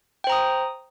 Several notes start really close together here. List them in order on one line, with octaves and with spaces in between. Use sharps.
G5 C5 A#5 D#6